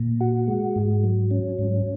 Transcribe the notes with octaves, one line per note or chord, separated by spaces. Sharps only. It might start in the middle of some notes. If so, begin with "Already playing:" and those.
Already playing: A#2
F#4
G#3
G#2
F#3
C#4
G#2